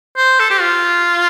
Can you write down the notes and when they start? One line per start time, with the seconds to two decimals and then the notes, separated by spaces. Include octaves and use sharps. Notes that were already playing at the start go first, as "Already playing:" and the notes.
0.16 C5
0.40 A4
0.50 G4
0.61 F4